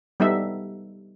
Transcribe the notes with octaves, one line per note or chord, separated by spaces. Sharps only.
G3 B3 D#4 A4 E5